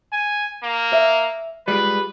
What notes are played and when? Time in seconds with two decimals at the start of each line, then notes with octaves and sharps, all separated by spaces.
0.13 G#5
0.63 A#3
0.93 E5
1.68 G3 G#3 F4 B4